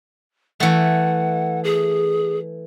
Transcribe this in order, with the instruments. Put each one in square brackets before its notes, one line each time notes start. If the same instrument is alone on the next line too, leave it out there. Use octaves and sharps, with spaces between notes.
[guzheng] E3 A3 [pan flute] F#5
[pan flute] G#4